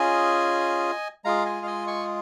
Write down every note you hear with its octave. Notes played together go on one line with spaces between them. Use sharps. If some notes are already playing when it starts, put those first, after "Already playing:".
Already playing: C#4 F4 G#4 D#5 G#5
G#3 F4 G#4 F5 A#5
D#5 G#5
F5
D#5 G#5
G#5 C#6